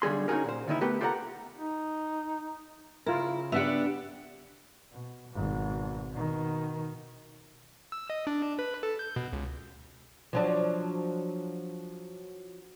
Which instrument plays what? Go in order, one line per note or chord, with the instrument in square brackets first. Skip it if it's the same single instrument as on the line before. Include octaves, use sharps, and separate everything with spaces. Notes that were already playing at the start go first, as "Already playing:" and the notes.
[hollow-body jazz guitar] B1 D3 G3 G#4 C6
C#4 D#4 F4 F#4 G#4 A#4
A#2 C5
D2 A#2 D#3 D#4 E4
A3 B3 G4 A#4 B4
F4 G4 A4 C#5 F#5 A#5
[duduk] D#4
[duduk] C#3 [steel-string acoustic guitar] E4 [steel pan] F4 A#4
[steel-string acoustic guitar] B3 D4 G4 [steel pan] E5 F#5
[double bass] B2
G#1 B2
B2 D#3
[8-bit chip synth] E6
D#5
D4
B4
A4
G6
B2
C#2
[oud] F3 F#3 D4